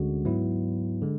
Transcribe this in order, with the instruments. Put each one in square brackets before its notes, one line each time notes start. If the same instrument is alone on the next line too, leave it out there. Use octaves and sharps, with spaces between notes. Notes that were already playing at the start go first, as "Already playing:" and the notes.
Already playing: [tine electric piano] D2 D3 G#3 C#4 F#4
G#2 F#3 B3 E4
D3 G#3